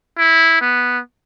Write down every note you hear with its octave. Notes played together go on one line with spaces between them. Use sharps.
E4
B3